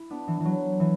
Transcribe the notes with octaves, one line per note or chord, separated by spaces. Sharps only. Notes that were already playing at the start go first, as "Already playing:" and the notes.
Already playing: E4
B3 D4
E3
E3
F#3
E3